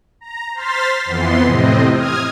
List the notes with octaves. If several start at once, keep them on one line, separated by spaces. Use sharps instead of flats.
A#5
C5 C6 F6 A6 B6
F2 E3 B3 C6
A2 C3 C4 D#5
D#6 F6 G#6